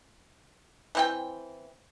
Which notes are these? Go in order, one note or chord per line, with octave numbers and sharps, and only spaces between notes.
E3 C4 G5